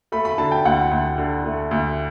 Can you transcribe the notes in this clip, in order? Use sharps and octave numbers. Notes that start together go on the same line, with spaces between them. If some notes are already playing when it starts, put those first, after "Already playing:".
A3 B5
B5
D3 A5
G5
D2 F#5
D2
D3
A3
D2